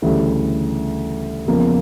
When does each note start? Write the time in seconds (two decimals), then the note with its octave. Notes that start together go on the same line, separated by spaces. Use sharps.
0.02 D2 C#3 E3 G3
1.47 E2 C#3 F3 A#3